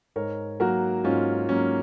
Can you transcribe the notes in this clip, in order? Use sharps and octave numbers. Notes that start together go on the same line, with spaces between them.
G#2 A#4 C#5
F#3 A#3 F#4 A#4
G#2 C#4 F4
F#3 A#3 C#4